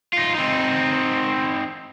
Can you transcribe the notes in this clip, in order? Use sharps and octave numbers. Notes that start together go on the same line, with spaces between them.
D#4 F4
C4 D#4